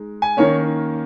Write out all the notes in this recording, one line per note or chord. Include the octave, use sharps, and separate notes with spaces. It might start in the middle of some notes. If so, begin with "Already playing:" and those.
Already playing: G#3 D#4
G#5
D#3 A#3 C#4 C#5